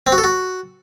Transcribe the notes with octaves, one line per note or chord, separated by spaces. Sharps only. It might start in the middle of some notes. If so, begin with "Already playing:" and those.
C4
F#4
A4
F#4